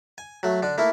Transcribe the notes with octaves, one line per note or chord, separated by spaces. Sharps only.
G#5
F#3 A3
D3 D4
A3 A#3 E4